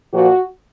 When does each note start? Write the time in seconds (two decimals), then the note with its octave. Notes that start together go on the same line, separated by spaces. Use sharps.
0.13 A#2 F3 F#4